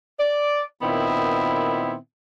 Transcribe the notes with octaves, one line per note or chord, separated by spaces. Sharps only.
D5
A#2 D#3 B3 C4 E4